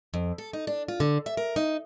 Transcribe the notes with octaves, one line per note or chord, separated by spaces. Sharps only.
F2
A4
D#4
D4
F4
D3
E5
A#4
D#4